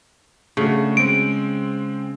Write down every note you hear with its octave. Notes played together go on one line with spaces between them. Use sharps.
C#3 A3 D4 F#4
G#3 C4 D7